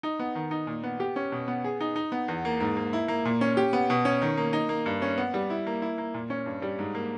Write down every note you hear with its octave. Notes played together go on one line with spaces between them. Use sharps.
D#4
B3
D#3
D#4
A#2
B3
G4
C#4
B2
B3
G#4
D#4
D#4
B3
E2
A#3
G#2
A#3
E4
A#3
A#2
C#4
G4
B3
B2
C#4
D#3
A#3
D#4
A#3
G2
C#4
B3
G3
E4
A#3
E4
A#3
A#2
C#4
G2
G3
G#2
A#3